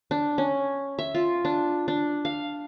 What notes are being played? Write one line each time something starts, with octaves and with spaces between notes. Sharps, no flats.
D4
C#4
E5
F4
D4
D4
F5